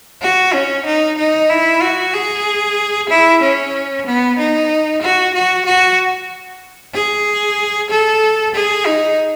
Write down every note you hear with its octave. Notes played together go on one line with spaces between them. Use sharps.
F#4
C#4
D#4
D#4
E4
F#4
G#4
E4
C#4
B3
D#4
F#4
F#4
F#4
G#4
A4
G#4
D#4